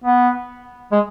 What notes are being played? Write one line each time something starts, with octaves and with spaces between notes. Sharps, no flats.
B3
G#3